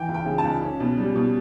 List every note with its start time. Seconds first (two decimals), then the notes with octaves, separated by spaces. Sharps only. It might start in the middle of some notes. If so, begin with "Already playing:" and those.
Already playing: E3 G5
0.08 C#2
0.14 G5
0.25 C#3
0.38 A5
0.44 C#2
0.62 C#4
0.80 B2
0.98 G3
1.16 B2